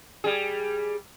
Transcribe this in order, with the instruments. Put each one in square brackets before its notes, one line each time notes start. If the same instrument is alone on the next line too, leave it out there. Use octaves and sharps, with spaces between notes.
[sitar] G3 G#4